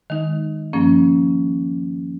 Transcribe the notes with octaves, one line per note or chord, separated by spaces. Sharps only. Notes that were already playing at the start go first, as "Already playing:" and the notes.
D#3 G#3 D#4
G2 F3 A#3 C#4